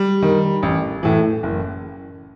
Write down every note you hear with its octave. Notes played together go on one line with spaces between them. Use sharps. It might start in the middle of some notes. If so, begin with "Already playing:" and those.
Already playing: G3
D#3
A1
A2 E3
F#1